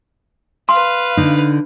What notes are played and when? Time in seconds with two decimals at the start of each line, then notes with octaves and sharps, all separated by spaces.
0.69 B4 F5 C6
1.17 D3 D#4